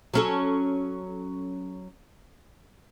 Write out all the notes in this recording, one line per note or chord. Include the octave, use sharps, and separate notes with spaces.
F#3 C#4 A4